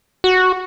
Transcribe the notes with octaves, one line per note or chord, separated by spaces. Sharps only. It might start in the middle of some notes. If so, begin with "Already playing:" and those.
F#4